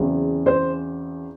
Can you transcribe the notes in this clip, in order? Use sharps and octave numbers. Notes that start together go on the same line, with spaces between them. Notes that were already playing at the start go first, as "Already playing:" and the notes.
Already playing: E2 C#3 F#3 C4 E4
C5